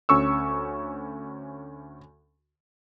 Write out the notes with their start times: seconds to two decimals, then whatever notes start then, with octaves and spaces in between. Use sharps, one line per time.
0.09 D2 C#4 C#6 E6